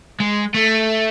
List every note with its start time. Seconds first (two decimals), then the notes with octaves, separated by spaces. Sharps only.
0.20 G#3
0.54 A3